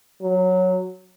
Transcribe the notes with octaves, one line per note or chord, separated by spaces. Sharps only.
F#3